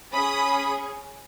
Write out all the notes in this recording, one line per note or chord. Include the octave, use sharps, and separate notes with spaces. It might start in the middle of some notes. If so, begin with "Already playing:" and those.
C#4 G#4 B5 D#6